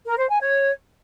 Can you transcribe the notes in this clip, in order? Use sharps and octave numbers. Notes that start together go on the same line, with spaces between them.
A#4
C5
G#5
C#5